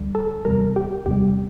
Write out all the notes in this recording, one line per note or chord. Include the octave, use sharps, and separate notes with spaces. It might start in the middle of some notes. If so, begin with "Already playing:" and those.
Already playing: D2 D3 G3
A4
E2 C3 G3 A#4
G4
E2 C3 G3 G4